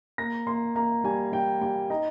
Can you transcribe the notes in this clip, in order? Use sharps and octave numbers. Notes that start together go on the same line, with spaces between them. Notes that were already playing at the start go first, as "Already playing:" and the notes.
A#3 A#6
A#3 C6
A#3 A#5
G3 G#5
G3 G5
G3 G5
D#4 A#5